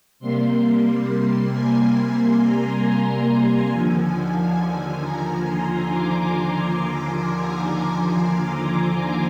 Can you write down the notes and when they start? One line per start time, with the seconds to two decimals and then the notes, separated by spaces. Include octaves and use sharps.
0.19 C3 G3 A#3 C6
0.63 C6
1.07 C6
1.51 G#5
1.94 C6
2.38 A#5
2.82 G#5
3.70 D#2 D3 F3
4.57 G#5
5.01 A#5
5.45 C6
5.89 D6